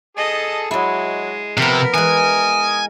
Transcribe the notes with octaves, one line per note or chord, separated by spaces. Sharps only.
G#4 A4 D#5 A5
F#3 G#3 E4 D#5
C3 F3 B3 A#4
E3 G#3 G#5 D#6